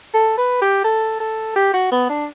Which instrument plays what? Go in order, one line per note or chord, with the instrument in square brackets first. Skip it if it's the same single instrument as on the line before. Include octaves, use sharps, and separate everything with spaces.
[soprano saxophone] A4
B4
G4
A4
A4
G4
F#4
B3
D4